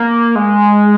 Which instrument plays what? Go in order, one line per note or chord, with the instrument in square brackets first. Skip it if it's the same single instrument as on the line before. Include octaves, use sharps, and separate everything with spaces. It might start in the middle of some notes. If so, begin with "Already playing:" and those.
Already playing: [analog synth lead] A#3
G#3